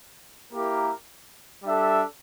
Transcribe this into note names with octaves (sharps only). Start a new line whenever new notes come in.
A#3 E4 G4 A#4
G3 D4 A4 E5